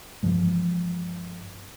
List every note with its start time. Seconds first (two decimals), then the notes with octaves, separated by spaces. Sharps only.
0.23 G2 E3 F3 G#3